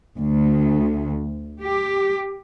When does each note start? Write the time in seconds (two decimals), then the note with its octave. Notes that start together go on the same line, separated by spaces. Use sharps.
0.18 D2
1.61 G4